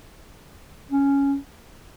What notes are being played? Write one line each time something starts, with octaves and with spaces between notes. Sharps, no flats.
C#4